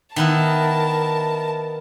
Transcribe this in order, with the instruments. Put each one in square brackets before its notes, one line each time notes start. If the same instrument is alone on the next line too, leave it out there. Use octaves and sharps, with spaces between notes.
[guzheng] D#3 B3 E4 [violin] A#4 A5